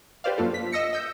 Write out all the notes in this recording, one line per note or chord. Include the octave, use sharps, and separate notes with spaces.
G4 B4 C5 D5 F5
F#2 A#3 D4 F4 A4
B6
D#5 E6 A#6 C#7
D#5 E6 G6